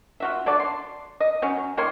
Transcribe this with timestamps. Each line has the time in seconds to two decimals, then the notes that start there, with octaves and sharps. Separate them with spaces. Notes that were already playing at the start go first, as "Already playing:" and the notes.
0.20 F4 F#4 E5
0.46 D3 D4 F#4 D5
0.60 C6
1.20 D#5
1.42 F#3 C#4
1.77 D#3 A#3 C#5 C6